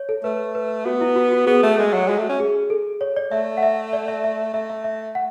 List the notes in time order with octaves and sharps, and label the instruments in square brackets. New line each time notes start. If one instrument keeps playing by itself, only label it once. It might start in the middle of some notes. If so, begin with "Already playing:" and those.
Already playing: [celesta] C#5
A4
[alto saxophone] A3 [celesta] B4
[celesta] B4
[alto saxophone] B3 [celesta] F#4
[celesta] E4
F#4
F#4
[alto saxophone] B3 [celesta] G#4
[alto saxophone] A3
[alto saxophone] G#3 [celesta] A4
[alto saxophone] F#3
[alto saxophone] G#3 [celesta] F#4
[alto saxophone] A3
C#4
[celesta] G#4
A4
C#5
D5
[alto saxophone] A3 [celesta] E5
[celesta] F#5
E5
D5
E5
E5
[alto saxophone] A3 [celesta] E5
[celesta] E5
E5
F#5